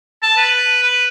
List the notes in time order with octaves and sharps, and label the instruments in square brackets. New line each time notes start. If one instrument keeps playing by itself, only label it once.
[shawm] A5
B4
B4